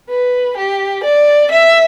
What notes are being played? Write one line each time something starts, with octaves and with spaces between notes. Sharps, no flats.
B4
G4
D5
E5